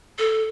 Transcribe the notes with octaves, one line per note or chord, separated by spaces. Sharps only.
A4